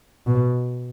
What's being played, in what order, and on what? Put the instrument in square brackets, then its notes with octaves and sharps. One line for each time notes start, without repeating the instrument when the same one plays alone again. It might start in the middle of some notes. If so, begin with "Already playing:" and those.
[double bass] B2